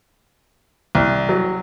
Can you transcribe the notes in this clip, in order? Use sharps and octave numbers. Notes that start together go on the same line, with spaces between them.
C2
F#3